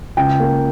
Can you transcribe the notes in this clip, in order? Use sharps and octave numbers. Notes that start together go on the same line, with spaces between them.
C#2 G5
A#3